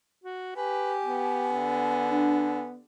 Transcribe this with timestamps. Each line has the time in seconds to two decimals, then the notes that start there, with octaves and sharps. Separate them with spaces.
0.24 F#4
0.56 G4 B4 G#5
1.04 B3
1.52 D3
2.09 D4